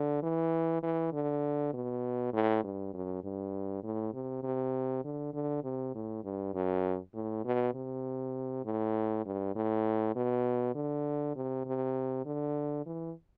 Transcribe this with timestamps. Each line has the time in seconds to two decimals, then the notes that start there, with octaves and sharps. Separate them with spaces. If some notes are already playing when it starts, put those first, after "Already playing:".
Already playing: D3
0.23 E3
0.83 E3
1.13 D3
1.73 B2
2.33 A2
2.64 G2
2.94 F#2
3.24 G2
3.83 A2
4.13 C3
4.43 C3
5.04 D3
5.33 D3
5.64 C3
5.95 A2
6.24 G2
6.54 F#2
7.14 A2
7.45 B2
7.75 C3
8.65 A2
9.25 G2
9.55 A2
10.15 B2
10.75 D3
11.35 C3
11.66 C3
12.26 D3
12.86 E3